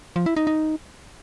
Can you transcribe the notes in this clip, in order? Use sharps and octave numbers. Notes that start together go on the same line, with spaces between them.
F3
E4
D#4
D#4